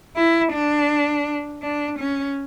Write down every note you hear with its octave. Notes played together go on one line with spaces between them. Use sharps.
E4
D4
D4
C#4